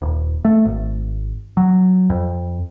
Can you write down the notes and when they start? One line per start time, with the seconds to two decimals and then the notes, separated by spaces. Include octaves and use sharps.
0.02 D#1
0.45 A3
0.65 G#1
1.57 F#3
2.10 F2